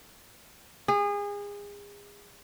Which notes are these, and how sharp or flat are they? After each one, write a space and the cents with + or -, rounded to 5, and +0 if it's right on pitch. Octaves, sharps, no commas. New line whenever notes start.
G#4 -30